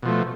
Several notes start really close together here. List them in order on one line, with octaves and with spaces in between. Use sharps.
B2 F3 A3